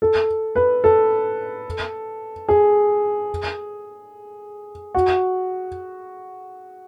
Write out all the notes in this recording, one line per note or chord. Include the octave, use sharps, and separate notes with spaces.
A4
B4
A4
G#4
F#4